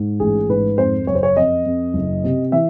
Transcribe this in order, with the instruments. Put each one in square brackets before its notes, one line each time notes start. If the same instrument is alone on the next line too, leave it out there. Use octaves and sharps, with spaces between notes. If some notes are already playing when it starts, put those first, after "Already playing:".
Already playing: [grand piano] G#2
A1 G#4
G#2 B4
F2 C5
F#1 C#5
C5
C#5
F2 D#5
F2
F#1
C3
E3 E5